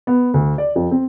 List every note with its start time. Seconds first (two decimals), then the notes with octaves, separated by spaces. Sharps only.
0.07 B3
0.34 D2
0.58 D5
0.76 F2
0.91 C4